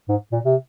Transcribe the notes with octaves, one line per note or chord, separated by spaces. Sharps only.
G#2
A#2
C3